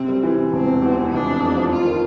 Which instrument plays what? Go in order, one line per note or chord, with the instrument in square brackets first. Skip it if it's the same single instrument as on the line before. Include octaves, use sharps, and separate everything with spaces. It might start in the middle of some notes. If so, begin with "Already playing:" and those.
Already playing: [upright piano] C3 [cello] C4
[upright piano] G3
E3
C3
[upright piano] E1 [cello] C4
[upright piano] C3
E2
E3
[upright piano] F1 [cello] D4
[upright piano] C3
F2
F3
[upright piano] F2 [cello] F4
[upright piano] D#3